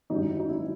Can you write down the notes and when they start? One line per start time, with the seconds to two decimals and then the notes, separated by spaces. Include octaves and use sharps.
0.10 G#1 F#2 D3 G3 D#4
0.30 E4
0.40 D#4
0.49 E4